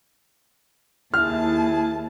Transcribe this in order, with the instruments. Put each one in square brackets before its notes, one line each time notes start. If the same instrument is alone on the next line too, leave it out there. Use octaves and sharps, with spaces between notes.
[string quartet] D#2 A5 [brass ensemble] E4 G#4 [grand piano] F6